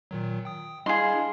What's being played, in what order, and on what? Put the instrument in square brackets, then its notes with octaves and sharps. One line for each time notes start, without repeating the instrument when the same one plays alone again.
[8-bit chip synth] A#2 D#3 F#3
G5 D#6
[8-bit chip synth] G3 D4 E4 [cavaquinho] G#4 C6 [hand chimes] D#5 F5